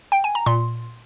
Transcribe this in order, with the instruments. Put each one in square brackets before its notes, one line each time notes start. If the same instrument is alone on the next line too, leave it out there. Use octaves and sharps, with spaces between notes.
[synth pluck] G5
G#5
A#5
A#2 C6